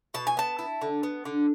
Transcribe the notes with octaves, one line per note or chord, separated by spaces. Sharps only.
B2 A5
G#5
B3 A5
E4
D3
B3
D3